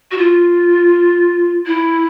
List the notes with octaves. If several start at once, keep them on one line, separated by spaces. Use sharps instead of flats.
F#4
F4
E4